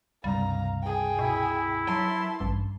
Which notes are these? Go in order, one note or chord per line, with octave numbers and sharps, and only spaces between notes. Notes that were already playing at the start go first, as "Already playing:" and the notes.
C#2 G2 C3 G3 F5 A#5
G#4 G5
B2 E4
F#3 A5 C6
A1 G2